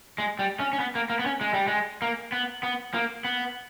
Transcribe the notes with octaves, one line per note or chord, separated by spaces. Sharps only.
G#3
G3
C#4
C#4
B3
A#3
A#3
B3
C#4
G#3
G3
G#3
A#3
B3
B3
A#3
B3